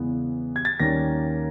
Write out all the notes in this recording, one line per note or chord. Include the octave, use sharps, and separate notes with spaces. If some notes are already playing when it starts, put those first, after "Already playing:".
Already playing: E2 C#3 E3 G#3 B3
G#6
A6
D#2 D#3 G3 A#3 C#4 A#6